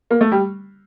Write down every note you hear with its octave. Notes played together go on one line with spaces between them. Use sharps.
A#3
A3
G3